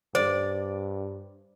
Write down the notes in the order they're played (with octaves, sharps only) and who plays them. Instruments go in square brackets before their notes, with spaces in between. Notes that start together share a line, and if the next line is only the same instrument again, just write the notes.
[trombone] G2 [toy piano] C5 [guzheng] D5